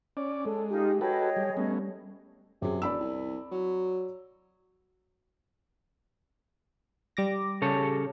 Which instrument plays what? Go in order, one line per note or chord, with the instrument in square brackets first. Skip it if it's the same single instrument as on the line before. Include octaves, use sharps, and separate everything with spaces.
[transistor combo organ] C#4 D5
[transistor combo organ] G#3 [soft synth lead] A4
[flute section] D#4 F4 [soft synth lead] G4
[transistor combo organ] F#4 A4 B4 [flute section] G#4 C#5 D#5 [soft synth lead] G5
[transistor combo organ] G3
[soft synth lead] G3 [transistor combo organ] A3 B3 C#4
[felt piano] F#2 G#4 [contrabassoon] C3
[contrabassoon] E1 [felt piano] D5 B5 E6
[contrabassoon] C2
F#3
[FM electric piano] G3 D6 A#6
[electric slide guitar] C#3 A4 C#5